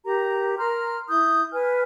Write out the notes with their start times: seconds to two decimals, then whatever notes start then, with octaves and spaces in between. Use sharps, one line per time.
0.04 G4 A#4 A#5
0.58 A#4 A#5 C6 F6
1.09 E4 D#6 G6
1.53 B4 G#5 F6